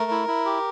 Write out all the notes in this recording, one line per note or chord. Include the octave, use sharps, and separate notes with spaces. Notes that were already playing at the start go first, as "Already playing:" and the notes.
Already playing: A3 A#4
E4
E4
G4